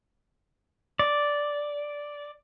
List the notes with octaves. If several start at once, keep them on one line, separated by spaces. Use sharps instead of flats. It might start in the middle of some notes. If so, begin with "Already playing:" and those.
D5